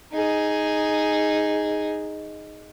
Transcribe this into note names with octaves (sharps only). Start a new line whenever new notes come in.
D#4 G#4